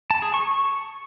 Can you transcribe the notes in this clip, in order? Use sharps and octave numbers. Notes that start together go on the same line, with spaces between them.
A5
G#4
C#6